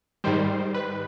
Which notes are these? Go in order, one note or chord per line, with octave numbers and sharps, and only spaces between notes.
G#2 D#3 G3 C5
B4